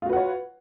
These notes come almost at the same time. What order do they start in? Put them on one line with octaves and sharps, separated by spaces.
F4 F#4 B4 F#5 C#5